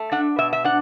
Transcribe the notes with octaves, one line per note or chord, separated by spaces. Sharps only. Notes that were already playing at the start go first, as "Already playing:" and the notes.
Already playing: A3
D4 F#5
B2 E5
E5
D4 F#5